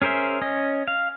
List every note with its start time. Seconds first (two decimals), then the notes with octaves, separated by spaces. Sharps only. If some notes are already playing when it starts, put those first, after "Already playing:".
0.02 C#4 G#4 A#4 C5 E5
0.42 C#4 D#5
0.88 F5